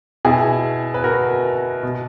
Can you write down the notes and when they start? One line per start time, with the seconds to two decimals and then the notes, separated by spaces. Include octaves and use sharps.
0.25 B2 E4 G#4
0.94 B4
1.04 F#4 A#4
1.83 B2